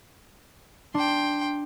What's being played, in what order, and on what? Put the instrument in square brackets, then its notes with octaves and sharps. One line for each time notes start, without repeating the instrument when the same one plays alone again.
[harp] D4 [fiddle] G5 C6